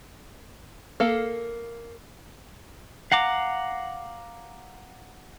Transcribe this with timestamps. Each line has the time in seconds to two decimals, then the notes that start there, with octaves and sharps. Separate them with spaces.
1.00 A#3 A4 F5
3.12 F5 F#5 A#5 D6